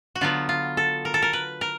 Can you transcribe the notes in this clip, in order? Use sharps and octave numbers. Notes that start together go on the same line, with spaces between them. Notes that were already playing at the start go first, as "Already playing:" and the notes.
F#4
D3 F#3 B3 F4
F4
A4
A#4
A4
A#4
B4
A#4